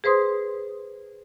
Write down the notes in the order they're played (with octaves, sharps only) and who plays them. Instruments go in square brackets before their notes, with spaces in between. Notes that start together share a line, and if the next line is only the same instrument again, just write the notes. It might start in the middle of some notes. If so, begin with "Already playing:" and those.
[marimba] G#4 B4 C5 C6 D#6